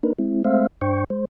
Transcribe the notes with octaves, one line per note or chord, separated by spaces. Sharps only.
A#3 D4 D#4 A#4 B4
G#3 C4 E4
G#3 A3 C4 C5 E5 F5
G2 D4 C5 G5 C#6
G#3 C5